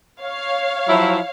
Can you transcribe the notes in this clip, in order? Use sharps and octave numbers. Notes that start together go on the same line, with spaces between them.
C#5 F5
F3 F#3 E4